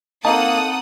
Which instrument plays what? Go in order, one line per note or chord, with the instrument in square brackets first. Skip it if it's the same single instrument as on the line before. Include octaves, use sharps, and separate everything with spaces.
[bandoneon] A#3 [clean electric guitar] C4 A5 [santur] D#4 E6 [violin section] A4 F#5 D#6